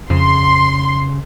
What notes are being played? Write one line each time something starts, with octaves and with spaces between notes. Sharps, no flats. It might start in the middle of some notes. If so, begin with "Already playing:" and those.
F2 C#3 C6